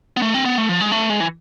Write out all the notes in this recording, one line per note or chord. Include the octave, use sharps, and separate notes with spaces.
B3
A3
C4
B3
A3
F3
G#3
A3
G#3
E3